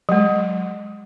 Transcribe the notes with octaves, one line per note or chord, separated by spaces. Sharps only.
F#3 G#3